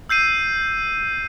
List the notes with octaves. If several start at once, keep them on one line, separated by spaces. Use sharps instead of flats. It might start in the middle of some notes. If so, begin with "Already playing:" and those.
E6 G6 C7 D#7